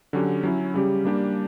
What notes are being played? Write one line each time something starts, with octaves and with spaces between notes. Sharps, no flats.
D3 F#3 C#4 G4
F#3 C#4 E4
C#3 G3 C#4 G4
G3 A#3 D4 G4